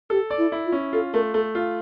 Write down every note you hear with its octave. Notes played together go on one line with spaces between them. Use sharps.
G4 A4
D5
E4
E4
F4
C#4
F4 A4
A3 A#4
A3 A4
F4